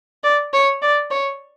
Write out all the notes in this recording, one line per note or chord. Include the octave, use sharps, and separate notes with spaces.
D5
C#5
D5
C#5